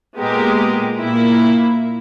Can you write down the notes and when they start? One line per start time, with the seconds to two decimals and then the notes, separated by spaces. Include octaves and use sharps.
0.17 A#2 G#3 B3 G4 A#4
1.00 A#2 A#3 E4